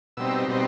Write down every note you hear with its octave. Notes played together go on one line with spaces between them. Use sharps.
B2 G3 C4 D#4 E6
B2 G3 C4 D#4